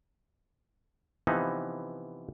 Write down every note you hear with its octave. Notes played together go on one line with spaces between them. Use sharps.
C3 E3 F3 B3 D#4